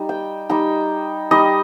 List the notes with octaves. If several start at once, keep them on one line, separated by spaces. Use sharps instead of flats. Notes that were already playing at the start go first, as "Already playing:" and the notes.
Already playing: G3 D#4
G5
G3 D#4 G5
G3 D#4 D#5